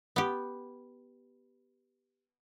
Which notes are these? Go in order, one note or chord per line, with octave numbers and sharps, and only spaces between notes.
B3 G4